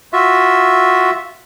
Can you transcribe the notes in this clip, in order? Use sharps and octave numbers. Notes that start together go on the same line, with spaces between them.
F4 F#4 E5